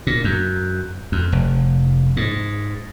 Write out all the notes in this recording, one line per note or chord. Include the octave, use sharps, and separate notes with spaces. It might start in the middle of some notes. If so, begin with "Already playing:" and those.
A#2
F#2
F2
F1
G#2